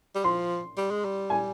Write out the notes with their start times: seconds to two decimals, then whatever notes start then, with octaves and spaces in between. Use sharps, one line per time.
0.15 G3
0.24 F3 C6
0.77 G3
0.90 G#3
1.05 G3
1.30 G#5